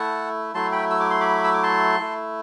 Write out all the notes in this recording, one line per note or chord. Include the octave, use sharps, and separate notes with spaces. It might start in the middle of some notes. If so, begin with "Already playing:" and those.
Already playing: A3 E4 F#5 A5
F#3 A3 E4 A5 C6
G5 B5
E6
D6
C6
B5 D6
E6
D6
A5 C6
A3 E4